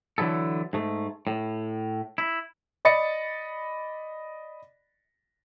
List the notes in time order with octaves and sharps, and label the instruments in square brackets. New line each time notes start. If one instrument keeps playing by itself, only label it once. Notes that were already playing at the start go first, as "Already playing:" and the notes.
[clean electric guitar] D3 E3 F#3 E4 A4
G#2 A3
A2
E4
[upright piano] D5 D#5 B5 A6 A#6 C#7